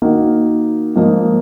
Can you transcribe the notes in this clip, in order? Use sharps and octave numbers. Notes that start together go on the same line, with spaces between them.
D#3 A#3 D#4 F#4 A#4
G#2 F3 A#3 D#4